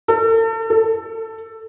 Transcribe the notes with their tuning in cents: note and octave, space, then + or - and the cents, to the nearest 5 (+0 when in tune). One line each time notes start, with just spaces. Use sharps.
A4 +40
A4 +15